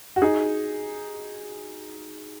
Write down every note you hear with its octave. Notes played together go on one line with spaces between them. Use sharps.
F#4
D#4 G#4